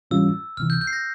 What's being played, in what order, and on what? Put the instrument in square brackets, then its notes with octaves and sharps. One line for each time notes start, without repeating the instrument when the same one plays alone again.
[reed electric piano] G#2 E3 G3 C#4 F4 [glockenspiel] E6
[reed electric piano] C#2 C3 E3 [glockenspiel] F6
[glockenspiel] G6
G6
C7
A#6